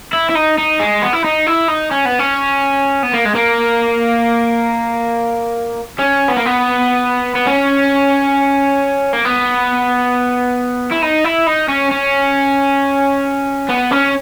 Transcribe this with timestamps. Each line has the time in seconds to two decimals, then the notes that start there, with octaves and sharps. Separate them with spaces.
0.13 E4
0.30 E4
0.35 D#4
0.58 D#4
0.80 G#3
1.02 B3
1.13 E4
1.24 D#4
1.47 E4
1.68 D#4
1.91 C#4
2.05 B3
2.19 C#4
3.03 B3
3.13 A#3
3.25 G#3
3.35 A#3
5.99 C#4
6.28 B3
6.37 A#3
6.45 B3
7.35 B3
7.47 C#4
9.13 A#3
9.25 B3
10.91 E4
11.02 D#4
11.24 E4
11.47 D#4
11.69 C#4
11.92 C#4
13.69 B3
13.91 C#4